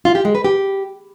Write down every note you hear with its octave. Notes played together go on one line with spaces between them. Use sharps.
F4
G4
G#3
B4
G4